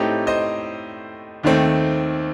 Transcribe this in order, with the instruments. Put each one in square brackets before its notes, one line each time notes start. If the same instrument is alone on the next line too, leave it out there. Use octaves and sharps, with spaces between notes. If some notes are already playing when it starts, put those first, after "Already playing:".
Already playing: [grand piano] A2 A3 C4 D#4 G4
C5 D#5
D#2 D#3 A3 C4